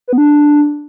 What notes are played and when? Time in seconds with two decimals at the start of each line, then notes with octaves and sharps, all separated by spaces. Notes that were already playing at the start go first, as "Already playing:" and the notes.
0.08 B4
0.13 B3
0.18 D4